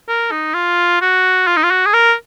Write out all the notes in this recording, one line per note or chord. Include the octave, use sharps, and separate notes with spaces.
A#4
D#4
F4
F#4
F4
D#4
F4
F#4
G#4
A#4